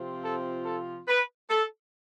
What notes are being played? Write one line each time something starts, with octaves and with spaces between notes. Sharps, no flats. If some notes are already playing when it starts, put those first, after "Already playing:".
Already playing: C3 F3 C4 F4
A4
A4
B4
A4